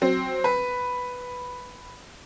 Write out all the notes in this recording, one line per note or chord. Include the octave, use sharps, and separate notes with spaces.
F#3 C4
B4